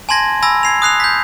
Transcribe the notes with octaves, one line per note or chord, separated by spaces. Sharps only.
G#5 A5 C6 G#6 A#6
G#5 B5 E6 A#6
G#6 C7 F7
D#6 F#6 C7 F7
G6 B6